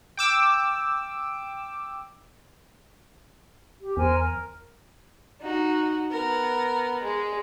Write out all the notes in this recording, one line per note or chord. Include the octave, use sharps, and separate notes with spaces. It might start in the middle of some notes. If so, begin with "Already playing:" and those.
G5 D6 E6
G4
E2 A#4 C5 G#5
A#4
D#4 F#4
B3 A#4
G#3